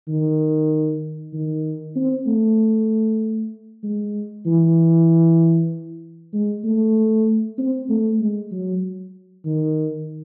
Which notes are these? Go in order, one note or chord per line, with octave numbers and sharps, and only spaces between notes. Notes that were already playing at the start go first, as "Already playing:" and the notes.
D#3
D#3
C4
A3
G#3
E3
G#3
A3
C4
A3
G#3
F#3
D#3